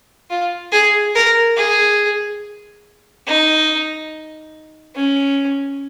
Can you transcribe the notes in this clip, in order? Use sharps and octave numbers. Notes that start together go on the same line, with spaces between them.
F4
G#4
A#4
G#4
D#4
C#4